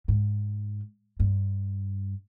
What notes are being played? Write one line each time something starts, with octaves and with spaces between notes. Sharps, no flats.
G#2
G2